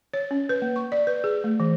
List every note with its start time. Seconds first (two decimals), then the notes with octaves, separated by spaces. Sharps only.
0.14 C#5
0.31 C#4
0.49 B4
0.62 A#3
0.76 C#6
0.92 D5
1.07 B4
1.24 G#4
1.44 A3
1.60 E3